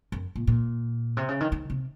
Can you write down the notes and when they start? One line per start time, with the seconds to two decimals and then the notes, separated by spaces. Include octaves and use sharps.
0.12 F#2
0.36 A#2
0.47 A#2
1.17 C3
1.28 C#3
1.40 D#3
1.52 D#3
1.70 C3